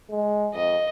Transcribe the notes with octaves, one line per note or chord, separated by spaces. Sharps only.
G#3
F2 D#5